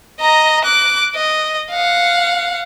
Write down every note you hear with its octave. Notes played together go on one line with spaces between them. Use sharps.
D#5 A#5
D6 F#6
D#5
F5 F#5